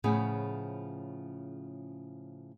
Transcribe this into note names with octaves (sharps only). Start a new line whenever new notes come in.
A2 C#3 F3 B3 C#4 G#4